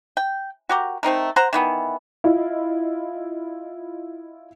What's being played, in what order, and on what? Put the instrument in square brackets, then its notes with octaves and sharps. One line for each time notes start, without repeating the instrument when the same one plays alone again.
[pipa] G5
F#4 G4 A#4
A3 C4 D#4 A#4
C5 F#5 A#5
D#3 E3 B3
[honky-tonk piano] E4 F4 D#5